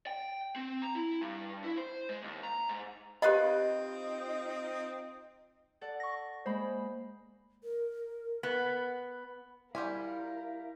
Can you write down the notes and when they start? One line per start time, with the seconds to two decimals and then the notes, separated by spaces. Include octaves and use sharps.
0.07 G5
0.56 C4
0.82 A#5
0.95 E4
1.21 G2
1.64 E4
1.78 C5
2.09 G#3
2.22 D#2
2.43 A#5
2.69 G#2
3.22 C4 D#4 F4 G4 B4 D#5 F5 B5
5.81 A4 D5 F#5
6.00 C#6 A#6
6.46 G#3 A#3 C5 B5
7.64 A#4
8.43 B3
9.75 G3 E4 F4 A#4 F5 G#5